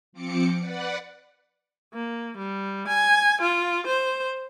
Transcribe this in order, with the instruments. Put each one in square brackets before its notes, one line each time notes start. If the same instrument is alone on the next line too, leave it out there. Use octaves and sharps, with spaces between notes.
[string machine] F3 C4 D6 C#7
B4 D5 F#5
[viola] A#3
G3
G#5
F4
C5